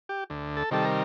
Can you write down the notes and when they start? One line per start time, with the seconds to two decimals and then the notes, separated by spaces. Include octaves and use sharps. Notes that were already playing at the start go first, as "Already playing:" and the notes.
0.09 G4
0.30 D2
0.57 A4
0.71 C3 D#3 G3 A4
0.85 A#4